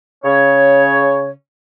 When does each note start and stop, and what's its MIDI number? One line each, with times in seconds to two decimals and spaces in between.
0.25 1.29 49
0.25 1.29 73